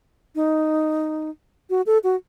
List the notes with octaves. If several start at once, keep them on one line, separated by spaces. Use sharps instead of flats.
D#4
F#4
A4
F#4